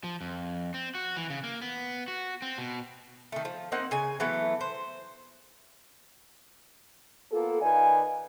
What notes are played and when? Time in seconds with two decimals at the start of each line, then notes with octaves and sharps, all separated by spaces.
0.04 F3
0.21 F2
0.74 C4
0.95 F#4
1.17 E3
1.30 C#3
1.44 A#3
1.62 B3
2.08 F#4
2.42 C4
2.58 B2
3.32 D#3 A3
3.45 F3
3.72 A#3 C4 D#4 F#5
3.91 C#3 G#5
4.20 E3 F#3 A3 B3
4.61 C5
7.32 A#3 B3 F4 A4
7.61 D#3 B4 D5 F5 G#5